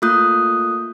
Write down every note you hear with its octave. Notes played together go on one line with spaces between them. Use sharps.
A3 A#3 F4 D#6 F#6 G6